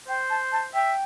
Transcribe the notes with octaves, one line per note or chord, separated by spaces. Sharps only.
C5 G5
A5
A5
E5 G5